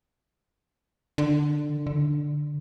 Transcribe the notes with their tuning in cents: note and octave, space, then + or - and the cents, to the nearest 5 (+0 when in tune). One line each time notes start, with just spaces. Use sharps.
D3 +15
D3 +5